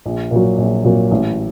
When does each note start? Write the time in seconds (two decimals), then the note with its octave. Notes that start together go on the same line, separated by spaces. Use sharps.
0.06 A#1
0.31 A#2 F#3
0.58 A#1
0.84 A#2 F#3
1.11 A1